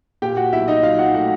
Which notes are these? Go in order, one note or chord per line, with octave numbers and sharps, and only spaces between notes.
A#2 G4 G5
F#4 F#5
B1 E4 E5
D#4 D#5
F#3 F4 F5
F#4 F#5
A3 F#4 F#5